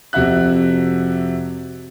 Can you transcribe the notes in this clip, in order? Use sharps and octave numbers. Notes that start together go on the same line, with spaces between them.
F2 C3 F#4 E5 F#6